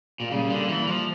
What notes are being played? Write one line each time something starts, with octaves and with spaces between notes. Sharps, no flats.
A#2
C#3 G3 A#3
D3
E3
F3